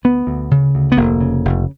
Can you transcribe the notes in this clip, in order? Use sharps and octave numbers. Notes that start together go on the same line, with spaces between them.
D2 B3
D2
C#3
D2
B3
F1 A#3
C#3
F1